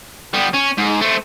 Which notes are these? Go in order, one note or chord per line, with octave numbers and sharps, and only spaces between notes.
G3 B3
C#4
G#2
A3 C4